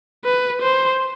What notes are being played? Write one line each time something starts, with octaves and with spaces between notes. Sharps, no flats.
B4
C5